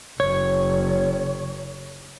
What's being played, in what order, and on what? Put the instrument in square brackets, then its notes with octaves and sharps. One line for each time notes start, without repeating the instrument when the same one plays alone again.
[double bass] F#1 [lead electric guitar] C#5